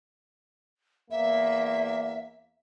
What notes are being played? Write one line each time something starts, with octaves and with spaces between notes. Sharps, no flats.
E2 A#3 E5